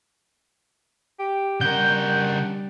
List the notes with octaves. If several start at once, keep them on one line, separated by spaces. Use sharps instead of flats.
G4
C#3 G3 D4 A#4 F#5 G6